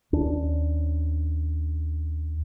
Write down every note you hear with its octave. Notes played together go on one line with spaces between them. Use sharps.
D#2 C#4 D4